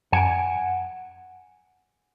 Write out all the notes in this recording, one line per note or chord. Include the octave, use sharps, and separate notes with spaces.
F#2 F#5 G#5 G#6 D7